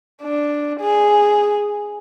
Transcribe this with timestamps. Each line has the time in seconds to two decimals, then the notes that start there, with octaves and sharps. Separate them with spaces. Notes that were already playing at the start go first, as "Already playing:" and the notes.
0.22 D4
0.80 G#4